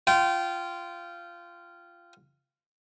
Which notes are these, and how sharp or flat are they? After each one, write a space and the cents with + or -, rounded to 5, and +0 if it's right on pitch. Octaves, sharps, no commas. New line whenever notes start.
F4 -15 G5 -25